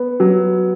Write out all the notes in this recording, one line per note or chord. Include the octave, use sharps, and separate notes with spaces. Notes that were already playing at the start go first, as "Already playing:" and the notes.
Already playing: B3
F#3